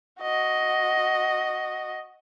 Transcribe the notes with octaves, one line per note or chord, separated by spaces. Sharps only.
F#4 D#5